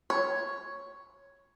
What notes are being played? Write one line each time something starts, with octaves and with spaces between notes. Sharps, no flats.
C#5